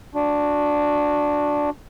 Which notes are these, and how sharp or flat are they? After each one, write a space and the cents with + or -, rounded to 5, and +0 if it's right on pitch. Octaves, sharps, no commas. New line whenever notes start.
D4 +0 F#4 -20